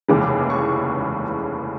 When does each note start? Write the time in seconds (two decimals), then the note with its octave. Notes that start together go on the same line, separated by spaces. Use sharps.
0.08 F1 D#2 C#3 E3 G#3 D6
0.50 C#6